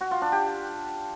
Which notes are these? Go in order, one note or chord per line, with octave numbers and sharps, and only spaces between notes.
F#4
F4
D4
G4